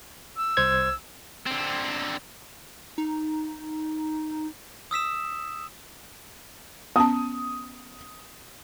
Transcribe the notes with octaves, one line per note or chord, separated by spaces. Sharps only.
E6
C2 C5 G#6
D3 C4
D#4
D#6 E6 B6 E7
B3 C#4 A5 D#6